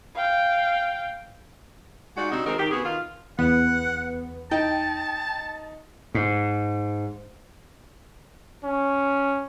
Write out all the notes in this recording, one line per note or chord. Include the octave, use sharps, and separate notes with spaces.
F5 G5
G#3 D#4 F4 F#4 D5 F#5
C3 C4 D4 D#4 F#4
D#3 G#3 C4 D#4 F#4 A#4
D#3 G4
C3 B3 F#4 G#4
D#3 F4
E2 B3 F#5
D#4 G5 A5
G#2
C#4